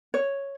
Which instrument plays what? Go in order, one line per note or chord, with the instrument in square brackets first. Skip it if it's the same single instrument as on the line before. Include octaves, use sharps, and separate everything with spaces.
[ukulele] C#5